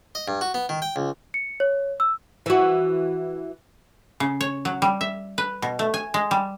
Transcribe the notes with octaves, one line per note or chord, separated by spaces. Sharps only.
D#5
G2
F#4
B3
D#3
G5
C#2
C#7
C#5
E6
E3 F#4
C#3
C#5
F#3
G3
E5
B4
B2
A3
G#5
G#3
G3